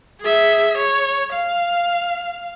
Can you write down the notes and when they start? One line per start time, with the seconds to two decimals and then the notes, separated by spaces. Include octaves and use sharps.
0.21 G#4 E5
0.77 C#5
1.33 F5